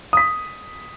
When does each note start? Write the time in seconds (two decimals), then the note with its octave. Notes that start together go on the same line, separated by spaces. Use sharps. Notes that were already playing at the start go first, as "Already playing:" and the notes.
0.13 D#6 B6